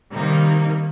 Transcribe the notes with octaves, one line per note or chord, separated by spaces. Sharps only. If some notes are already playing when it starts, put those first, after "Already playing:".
C3 D#3 G3 A#3 D#4